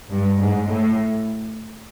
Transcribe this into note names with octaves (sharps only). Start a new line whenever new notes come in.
G2
G#2
A2